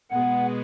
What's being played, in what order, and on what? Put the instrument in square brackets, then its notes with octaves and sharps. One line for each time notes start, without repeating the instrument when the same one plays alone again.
[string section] B2 G#3 B3 [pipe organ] F#5